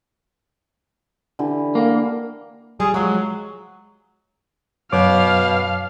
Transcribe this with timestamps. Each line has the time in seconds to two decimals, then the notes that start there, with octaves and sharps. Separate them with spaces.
1.39 D3 E3 G4
1.75 A#3
2.80 G3 G#4
2.94 F3 F#3 G#3
4.92 F#2 B2 C#5 F5 D6